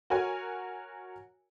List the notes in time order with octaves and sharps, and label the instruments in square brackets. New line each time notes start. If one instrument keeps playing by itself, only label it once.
[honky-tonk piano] F#4 A#4 C#5 G#5